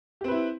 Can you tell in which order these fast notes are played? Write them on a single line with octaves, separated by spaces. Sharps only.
G4 C4 B4 E4